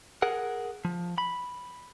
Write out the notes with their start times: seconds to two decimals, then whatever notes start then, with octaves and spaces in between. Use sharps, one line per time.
0.22 G#4 A#4 F#5
0.85 F3
1.18 B5